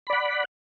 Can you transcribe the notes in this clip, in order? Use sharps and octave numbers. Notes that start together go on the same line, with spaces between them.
D5 F#5 B5